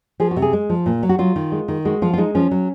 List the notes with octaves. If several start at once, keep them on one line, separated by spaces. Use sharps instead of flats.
F3 G#4
F#4
C3
G#4
G#3
F3
A#2
F#3
F#4
F#3 F4
D#3
G#3
D#3
G#3 F#4
F3 F4
F4
G#3 D#4
F3 C#4
F#3